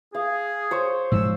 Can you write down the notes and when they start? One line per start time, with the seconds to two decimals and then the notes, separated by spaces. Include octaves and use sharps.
0.14 G#4 F5
0.71 C5 C#5 C6
1.12 G#2 F3 G#3 E6